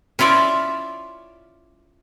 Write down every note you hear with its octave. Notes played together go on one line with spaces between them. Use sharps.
C#4 E4 F4 D5 E5